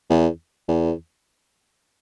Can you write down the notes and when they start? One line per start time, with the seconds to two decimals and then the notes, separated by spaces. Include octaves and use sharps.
0.10 E2
0.68 E2